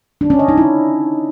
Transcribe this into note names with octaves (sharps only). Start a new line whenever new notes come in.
D4
C#4
D#5
D#4
E4